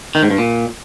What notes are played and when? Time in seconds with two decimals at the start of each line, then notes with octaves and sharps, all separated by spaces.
0.15 D#3
0.23 G#2
0.31 G2
0.38 A#2